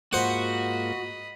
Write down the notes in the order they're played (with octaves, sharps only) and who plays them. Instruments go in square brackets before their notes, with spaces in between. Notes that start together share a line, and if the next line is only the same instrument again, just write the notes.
[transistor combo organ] G#2 A#3 F4 [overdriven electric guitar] F#4 [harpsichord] C5 F#5 [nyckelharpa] D#5 B5